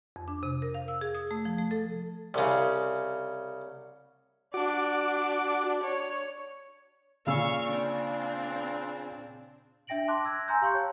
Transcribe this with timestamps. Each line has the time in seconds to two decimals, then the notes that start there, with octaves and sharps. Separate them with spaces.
0.16 F2
0.28 D4
0.43 C3
0.62 A#4
0.74 F5
0.88 E6
1.01 G#4
1.15 D#6
1.31 A3
1.45 F3
1.58 A3
1.71 A4
2.34 C2 C#3
4.54 D4 F#4 D6
5.83 C#5
7.27 A#2 C#3 F5 C#6 E6
7.69 C4 D4
9.87 D4 E5 G5 A#6 D7 F#7
10.08 A5 C6 D6 F#6 A#6
10.25 E6 G#6 A#6
10.47 G#5 A#5 C6 E6 F#6 G6
10.62 G4 F5 C6 C#6 G6 C#7
10.74 C#5 G5 A5